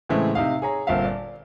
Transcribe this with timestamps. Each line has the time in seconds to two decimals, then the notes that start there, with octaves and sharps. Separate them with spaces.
0.09 A2 C#3 E3 G#3 A3 C4
0.35 C3 D#4 F5
0.62 G#4 C#5 A#5
0.87 G1 A#2 C4 E5 F5
1.05 D5